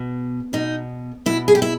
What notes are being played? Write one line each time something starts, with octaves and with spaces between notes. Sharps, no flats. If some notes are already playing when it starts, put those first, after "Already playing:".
Already playing: B2
B2 D#4
B2 E4
G#4
G4
E4